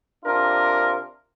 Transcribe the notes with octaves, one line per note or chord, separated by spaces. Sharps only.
C3 D4 F4 A#4